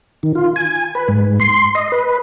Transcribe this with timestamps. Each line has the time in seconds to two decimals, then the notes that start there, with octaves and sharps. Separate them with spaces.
0.23 D#3
0.35 F4
0.56 G#5
0.95 B4
1.08 G#2
1.40 C6
1.75 D#5
1.92 B4